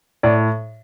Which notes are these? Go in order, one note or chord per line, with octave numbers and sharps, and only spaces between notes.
A2 D5